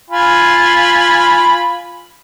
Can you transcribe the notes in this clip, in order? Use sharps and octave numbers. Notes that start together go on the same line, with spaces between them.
F4 G#5 B5